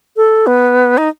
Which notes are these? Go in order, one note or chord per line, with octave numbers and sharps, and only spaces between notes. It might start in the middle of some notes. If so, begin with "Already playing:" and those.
A4
B3
D#4